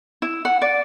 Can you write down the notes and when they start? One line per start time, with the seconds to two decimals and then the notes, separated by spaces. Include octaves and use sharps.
0.22 E4
0.45 F#5
0.62 D5